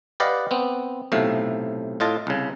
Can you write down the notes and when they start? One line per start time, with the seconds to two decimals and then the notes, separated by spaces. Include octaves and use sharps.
0.20 G4 B4 D5 D#5 F5 F#5
0.51 B3 C4
1.12 B1 A2 C3 A3 F5
2.00 A2 F4 D#5 A5
2.27 C2 C#3